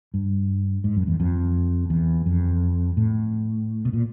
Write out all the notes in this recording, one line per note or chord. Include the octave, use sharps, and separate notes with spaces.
G2
G#2
F#2
E2
F2
E2
F2
A2
B2
A#2